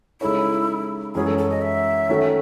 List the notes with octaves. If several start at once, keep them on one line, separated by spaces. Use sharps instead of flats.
C#3 G#3 D#4 E4 A4 C#5
F#2 E3 G#3 C#4 F#4 G#4
A4
A4
D#5
E5
D#3 A3 C#4 F#4 A4